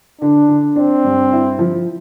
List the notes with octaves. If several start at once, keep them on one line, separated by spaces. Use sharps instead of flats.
D3 D4
D3
C4 D4
G2
E4
F3